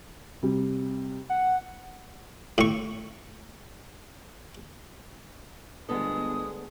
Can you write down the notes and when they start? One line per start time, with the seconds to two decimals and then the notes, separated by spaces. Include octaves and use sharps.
0.43 C3 G3
1.30 F#5
2.58 A2 C#6
5.89 G1 D2 G#3 B3 A4 D#6